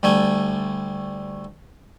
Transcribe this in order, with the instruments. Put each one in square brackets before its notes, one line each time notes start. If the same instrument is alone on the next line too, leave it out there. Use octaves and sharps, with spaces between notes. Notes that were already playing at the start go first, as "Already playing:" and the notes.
[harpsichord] D2 G3 A3 G#5